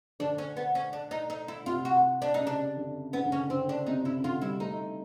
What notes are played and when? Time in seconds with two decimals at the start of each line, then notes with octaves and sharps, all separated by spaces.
0.20 D3 D4
0.38 C#4
0.57 B3
0.75 C#4
0.93 D4
1.11 D#4
1.30 D#4
1.48 E4
1.66 C3 F4
1.85 F#4
2.22 D4
2.34 D#4
2.40 C#3
2.47 D4
2.77 D3
3.13 C#3 B3
3.25 D3
3.32 C#3 C#4
3.50 D3 C4
3.68 C#3 D4
3.86 C3 D#4
4.05 C#3 E4
4.23 D3 F4
4.42 G3 E4
4.60 A3 D#4